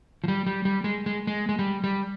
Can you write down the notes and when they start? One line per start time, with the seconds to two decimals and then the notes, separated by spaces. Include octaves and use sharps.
0.24 F3
0.28 G3
0.46 G3
0.65 G3
0.84 G#3
1.06 G#3
1.27 G#3
1.49 G#3
1.59 G3
1.84 G3